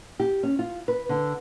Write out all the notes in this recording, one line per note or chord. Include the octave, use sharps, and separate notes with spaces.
G4
C#4
F4
B4
D3